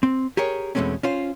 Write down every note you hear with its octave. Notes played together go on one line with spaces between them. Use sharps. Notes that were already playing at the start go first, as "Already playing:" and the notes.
C4
G4 G#4 A#4 C#5
E2 B2 G#3 A3 C4 C#4
C#4 F4 C5